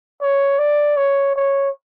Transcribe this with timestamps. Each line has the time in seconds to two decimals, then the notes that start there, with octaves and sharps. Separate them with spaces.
0.21 C#5
0.59 D5
0.97 C#5
1.36 C#5